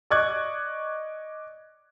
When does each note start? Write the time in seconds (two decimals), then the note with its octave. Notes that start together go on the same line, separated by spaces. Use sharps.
0.10 D5 D#5 C#6 D6 F#6 G#6